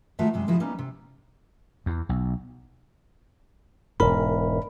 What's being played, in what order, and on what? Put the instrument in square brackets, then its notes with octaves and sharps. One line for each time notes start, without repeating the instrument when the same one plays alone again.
[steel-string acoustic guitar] D#3 G#3 A3 F4 F#4 E5
F#2 C3 G3 G#3
C#3 F3 E4 F#4 G#4
G3 A#3 B3 C#4 D#4
C3
[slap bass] E2
B1
[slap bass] E1 G#2 [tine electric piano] A#4 B5